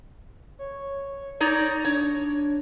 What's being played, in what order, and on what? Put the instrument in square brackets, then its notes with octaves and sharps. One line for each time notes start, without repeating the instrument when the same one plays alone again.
[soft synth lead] C#5
[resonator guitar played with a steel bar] D#4 C#5 D5 [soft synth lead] A#6
[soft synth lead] D4 [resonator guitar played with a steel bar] C#5